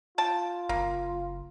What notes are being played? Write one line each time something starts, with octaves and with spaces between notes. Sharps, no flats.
F4 G5 A5
F#1 A#3